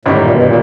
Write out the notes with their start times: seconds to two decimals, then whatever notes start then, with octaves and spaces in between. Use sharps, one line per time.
0.05 G1 F#2 A2 D#3 G3
0.18 A#2
0.31 B2
0.43 A#2